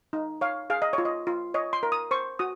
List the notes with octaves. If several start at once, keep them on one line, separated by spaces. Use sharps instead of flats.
D#4
C#5 F5
G#4 F5
D#5
C#5
F4
D#5
F4
C#5 D#5
C6
A#4
D#6
C5 C#6
F#4 D#6